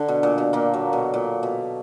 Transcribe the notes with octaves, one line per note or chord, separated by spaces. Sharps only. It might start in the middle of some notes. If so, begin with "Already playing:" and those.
Already playing: D3
B2
A#2
B2
A#2 A#3
F#3
B2
A#2
B2